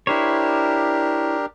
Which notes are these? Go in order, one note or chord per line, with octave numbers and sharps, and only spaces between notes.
D4 E4 G4 A#4 C5 C#5